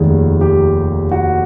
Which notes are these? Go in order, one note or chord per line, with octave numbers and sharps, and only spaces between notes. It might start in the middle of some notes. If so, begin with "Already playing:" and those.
Already playing: F1 D#2 D#3 G#4
G4
F#4